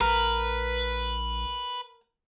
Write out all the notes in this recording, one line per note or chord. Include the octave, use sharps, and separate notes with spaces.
A#1 A#4 B4